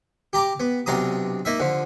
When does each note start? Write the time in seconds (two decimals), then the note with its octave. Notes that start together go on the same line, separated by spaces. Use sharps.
0.33 G4 A#5 D6
0.60 B3
0.86 B1 C3 D4 A#5 D#6
1.45 A#3 D#4 E5
1.60 D3 F3